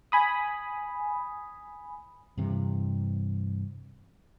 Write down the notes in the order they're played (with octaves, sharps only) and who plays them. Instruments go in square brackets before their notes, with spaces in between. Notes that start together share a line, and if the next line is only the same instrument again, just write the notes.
[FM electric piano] G#5 B5 D#6
[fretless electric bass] G2 C3 E3